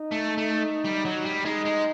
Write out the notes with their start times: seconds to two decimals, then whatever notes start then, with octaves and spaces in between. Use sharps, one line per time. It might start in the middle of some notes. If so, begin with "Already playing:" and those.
Already playing: D#4
0.12 A3
0.38 A3
0.85 G3
1.05 F#3
1.25 G3
1.45 G#3 D#4
1.65 G#3